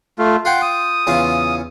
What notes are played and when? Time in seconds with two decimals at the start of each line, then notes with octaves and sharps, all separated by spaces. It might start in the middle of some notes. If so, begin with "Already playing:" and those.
0.19 A3 F4
0.45 F4 F#5 G5 C6
0.62 D#6
1.07 E2 C#3 F4